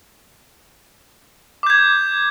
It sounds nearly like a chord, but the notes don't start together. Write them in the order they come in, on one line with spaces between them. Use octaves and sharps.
D6 G6 G#6